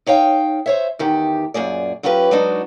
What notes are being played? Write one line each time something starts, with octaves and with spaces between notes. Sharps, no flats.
D#4 C#5 F5 G5
C5 C#5 E5
E2 D#3 G4
F#2 A#2 G#4 D5
F#3 C#4 F4 G4 B4
F#3 G#3 D4 D#4 F#4